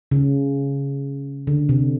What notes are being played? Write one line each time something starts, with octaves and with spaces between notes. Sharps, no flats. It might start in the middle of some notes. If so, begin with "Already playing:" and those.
C#3
D3
C3